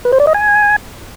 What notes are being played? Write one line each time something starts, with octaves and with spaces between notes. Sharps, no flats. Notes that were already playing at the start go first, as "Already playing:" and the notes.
B4
C5
D5
D#5
G#5